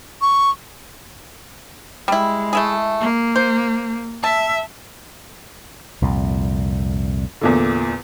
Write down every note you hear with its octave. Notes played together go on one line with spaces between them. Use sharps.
C#6
G3 G#3 E4
A3 E4 G#4
A#3
C5
E5 A5
C2 F2 A#2
E2 A#2 D3